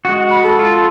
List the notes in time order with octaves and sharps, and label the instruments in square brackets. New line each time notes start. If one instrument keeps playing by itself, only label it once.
[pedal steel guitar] G#3 F#4
[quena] B5
A4
[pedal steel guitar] F4